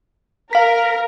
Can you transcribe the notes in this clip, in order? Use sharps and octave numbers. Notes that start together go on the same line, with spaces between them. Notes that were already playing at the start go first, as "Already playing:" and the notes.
A#4 F5 B6